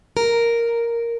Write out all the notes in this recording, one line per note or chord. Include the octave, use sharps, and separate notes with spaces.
A#4